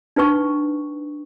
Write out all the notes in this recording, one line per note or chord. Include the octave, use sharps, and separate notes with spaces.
D4 D#4 B4 G5 C#6